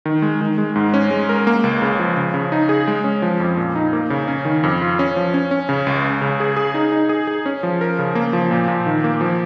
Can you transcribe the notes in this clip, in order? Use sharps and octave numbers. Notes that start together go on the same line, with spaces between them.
D#3
G#3
D#3
G#3
G#2
C#4
G#3
A#4
A#3
C#2
C#3
F3
C#3
C#3
D#4
G#4
G#3
C#4
F3
F2
A#2
D#4
A#3
C#3
C#4
D#3
F2
F4
C#4
F3
C#4
C#4
C#3
C#2
C#2
C#3
G#4
G#4
D#4
D#4
G#4
G#4
C#4
F3
A#4
C#3
A#3
F3
A#2
A#2
D#3
A#3
F3